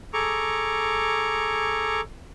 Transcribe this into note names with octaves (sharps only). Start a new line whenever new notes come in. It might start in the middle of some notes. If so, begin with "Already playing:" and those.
G#4 A4 A#5 C#6 D6